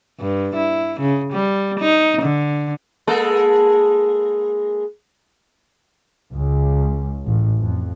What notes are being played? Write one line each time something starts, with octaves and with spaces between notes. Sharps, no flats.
G2
E4
C#3
G3
D#4
D3
G#3 A#3 A4
C#2
A1
F2